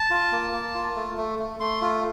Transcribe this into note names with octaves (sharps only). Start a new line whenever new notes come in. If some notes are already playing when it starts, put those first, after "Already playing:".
Already playing: A5
F4
A#3
A#3
F4
A3
A3
A3
A3 C6
F4